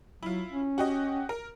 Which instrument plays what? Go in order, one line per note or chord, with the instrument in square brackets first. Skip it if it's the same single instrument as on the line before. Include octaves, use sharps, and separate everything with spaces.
[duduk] F#3 [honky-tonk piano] E4 F4
[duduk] C#4
[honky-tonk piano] F#4 G4 D#5
A#4